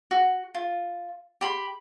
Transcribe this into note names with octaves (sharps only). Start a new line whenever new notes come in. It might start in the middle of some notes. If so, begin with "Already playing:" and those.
F#4
F4
G4 B5 C6